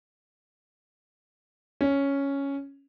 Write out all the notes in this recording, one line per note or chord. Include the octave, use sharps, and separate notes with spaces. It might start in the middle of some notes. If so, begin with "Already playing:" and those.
C#4